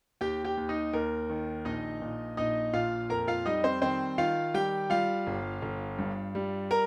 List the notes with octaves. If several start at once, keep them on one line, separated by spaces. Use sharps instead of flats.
D#2 G4 G5
G4 G5
D#2
D#4 D#5
D#2 A#4
D#3
A#1 D#4 D#5
A#2
A#1 D#4 D#5
A#2 F4 F5
F2 A#4 A#5
F4 F5
G3 D#4 D#5
C4 C5
D#3 C4 C5
D#3 F4 F5
G3 G4 G5
G3 F4 F5
G1
G1
G2
G3
A#4 A#5